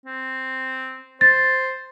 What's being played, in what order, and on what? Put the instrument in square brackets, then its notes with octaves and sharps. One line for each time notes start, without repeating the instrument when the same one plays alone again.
[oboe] C4
[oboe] C5 [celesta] A6